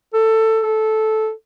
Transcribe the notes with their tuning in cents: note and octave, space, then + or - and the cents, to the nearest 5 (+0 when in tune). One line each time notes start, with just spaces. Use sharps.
A4 +15
A4 -10